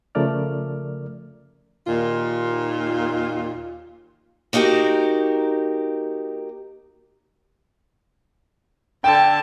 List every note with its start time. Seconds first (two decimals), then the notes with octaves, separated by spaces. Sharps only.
0.15 C#3 F3 A3 A#4 D5 F6
1.87 D#2 A#2 D#3 F4
4.53 A#3 D#4 F#4 G4 A#4
9.04 D3 G5 A5